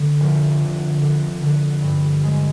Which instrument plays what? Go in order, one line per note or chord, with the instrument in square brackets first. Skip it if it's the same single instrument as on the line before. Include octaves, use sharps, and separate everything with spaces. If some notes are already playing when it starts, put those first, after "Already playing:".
Already playing: [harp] D3
F1
D3
D3
D3
G2
G#3